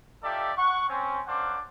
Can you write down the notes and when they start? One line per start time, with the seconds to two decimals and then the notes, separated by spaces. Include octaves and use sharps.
0.23 D#4 F4 G4 A4 D5 E5
0.57 F#5 C#6
0.89 C4 C#4
1.27 A#3 C#4 D4 C5 F#5 D6